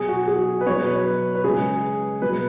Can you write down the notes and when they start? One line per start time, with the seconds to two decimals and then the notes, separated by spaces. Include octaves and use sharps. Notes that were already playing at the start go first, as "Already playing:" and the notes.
Already playing: B2 F#3 G#4
0.08 F#4
0.28 G#4
0.61 B4
0.67 B2 F#3 C#5
0.86 B4
1.35 B4
1.44 C#3 G#3 G#4
2.22 B2 F#3 B4